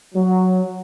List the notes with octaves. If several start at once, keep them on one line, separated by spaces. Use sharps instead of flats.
F#3